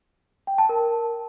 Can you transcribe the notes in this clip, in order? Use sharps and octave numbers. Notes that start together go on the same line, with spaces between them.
G5
A5
A#4